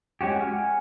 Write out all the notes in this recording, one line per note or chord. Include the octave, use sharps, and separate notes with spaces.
G#3 C#4 F#4 G4
F#5 G#5 F6